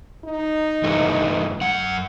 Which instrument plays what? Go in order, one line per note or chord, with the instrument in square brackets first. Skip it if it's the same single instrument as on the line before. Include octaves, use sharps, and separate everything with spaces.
[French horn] D#4
[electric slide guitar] G2 E3 A3
F#2 F#5